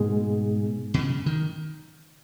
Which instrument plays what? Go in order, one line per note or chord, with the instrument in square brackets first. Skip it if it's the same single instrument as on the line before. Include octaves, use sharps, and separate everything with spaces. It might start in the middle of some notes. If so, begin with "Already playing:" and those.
Already playing: [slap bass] G#2 [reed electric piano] B2 G#3 B3 G#4
[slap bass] B2
C#3
D#3